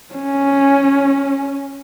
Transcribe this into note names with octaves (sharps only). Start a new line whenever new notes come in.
C#4